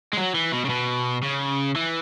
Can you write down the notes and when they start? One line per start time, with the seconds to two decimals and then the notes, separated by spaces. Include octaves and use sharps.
0.13 G#3
0.18 F#3
0.35 E3
0.53 B2
0.65 C#3
0.70 B2
1.23 C#3
1.76 E3